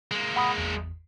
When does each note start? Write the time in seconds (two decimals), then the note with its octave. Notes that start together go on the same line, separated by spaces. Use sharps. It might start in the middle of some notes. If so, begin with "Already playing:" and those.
0.11 G#3 A#3
0.36 F#5 B5 D#6
0.58 G#1 E2